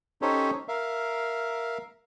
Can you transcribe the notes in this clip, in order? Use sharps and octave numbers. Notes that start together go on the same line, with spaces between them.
C#4 D#4 G4 A4 C5 C#5
A#4 E5 F5